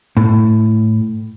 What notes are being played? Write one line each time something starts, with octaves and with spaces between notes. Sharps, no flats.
A2